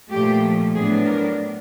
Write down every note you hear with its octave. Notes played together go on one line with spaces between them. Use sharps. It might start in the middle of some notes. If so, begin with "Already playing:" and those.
A#2 F3 A3 G4
A2 F#3 B3 D4 G#4
A#4